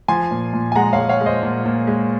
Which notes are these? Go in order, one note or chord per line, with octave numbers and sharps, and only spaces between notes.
F3 G#5 C6
A#2
A#2
G#5
G#3 F#5 A#5
C#5 F5
G#3
C#5 F5
G#3
C5 D#5
A#2
A#2
G#3